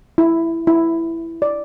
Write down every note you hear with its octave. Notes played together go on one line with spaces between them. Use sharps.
E4
E4
D5